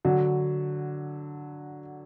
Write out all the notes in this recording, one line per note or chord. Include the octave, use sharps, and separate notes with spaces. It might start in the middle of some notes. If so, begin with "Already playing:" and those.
D3 F#3